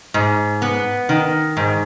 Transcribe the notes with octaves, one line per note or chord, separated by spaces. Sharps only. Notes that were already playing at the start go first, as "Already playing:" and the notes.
G#2
B3
D#3
G#2